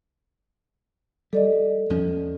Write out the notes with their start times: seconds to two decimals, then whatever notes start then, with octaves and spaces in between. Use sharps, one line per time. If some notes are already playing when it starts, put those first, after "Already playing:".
1.33 G3 A4 D5 D#5
1.90 E2 F3 C#4